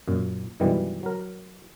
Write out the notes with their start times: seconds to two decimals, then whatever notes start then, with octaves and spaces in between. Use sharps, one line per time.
0.08 F#2 A#2
0.60 F#2 B2 D#3 E3 G3 G#3
1.03 F#3 A#4